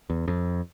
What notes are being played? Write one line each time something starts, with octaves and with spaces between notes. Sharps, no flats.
E2
F2